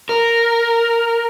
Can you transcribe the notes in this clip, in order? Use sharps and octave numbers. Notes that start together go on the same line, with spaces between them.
A#4